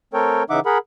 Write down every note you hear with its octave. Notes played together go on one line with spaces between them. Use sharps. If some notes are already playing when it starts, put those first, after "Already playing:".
A3 C4 A4 A#4 C#5 G5
C#3 E3 D#4 E5 F#5 D6
G#4 A#4 F#5 B5